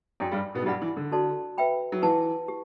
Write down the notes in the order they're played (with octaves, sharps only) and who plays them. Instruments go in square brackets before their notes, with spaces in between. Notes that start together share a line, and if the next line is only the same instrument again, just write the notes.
[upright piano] F#2 F#3 [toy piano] G4 D5 G5 C6
[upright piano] G2 G3
B2 B3
F#3
[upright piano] G2 G3 [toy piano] E4 G4 D5 F#5 B5
[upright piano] E3
D3
[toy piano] F#4 A4 D5 A5 C6
B4 E5 G5 B5
[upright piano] F#3
[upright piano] E3 [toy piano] E4 B4 F#5 A5
[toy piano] G4